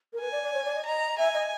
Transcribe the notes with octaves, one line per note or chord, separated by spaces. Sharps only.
A#4
B4 G#5
D5
D5
C#5
D5
D#5
D#5 A#5
E5 G#5
D#5